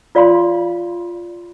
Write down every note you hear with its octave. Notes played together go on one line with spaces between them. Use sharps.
F4 D5 F5 B5 C6